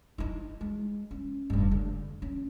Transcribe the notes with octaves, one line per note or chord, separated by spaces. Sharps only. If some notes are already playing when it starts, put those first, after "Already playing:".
D#4 E4
G#3
C#4
F1 G2
D3
C#4